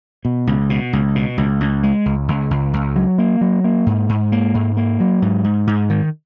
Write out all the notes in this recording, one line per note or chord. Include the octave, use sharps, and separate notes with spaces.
B2
C#2
B2
C#2
B2
C#2
C#2
G#3
C#2
C#2
C#2
C#2
F#3
A#3
F#3
A#3
G#2
G#2
A#3
G#2
A#3
F#3
G#2
G#2
G#2
D#3